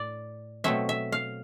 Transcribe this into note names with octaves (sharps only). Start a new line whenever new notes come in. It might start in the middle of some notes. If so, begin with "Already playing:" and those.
Already playing: A2 D5
B2 F#3 A3 C4 E5
E5
F5